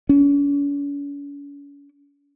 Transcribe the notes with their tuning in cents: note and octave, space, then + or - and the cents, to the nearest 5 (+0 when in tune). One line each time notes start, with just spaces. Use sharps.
C#4 +45